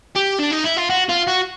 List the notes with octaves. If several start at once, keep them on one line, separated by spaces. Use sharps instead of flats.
G4
D4
D#4
E4
F4
F#4
F4
F#4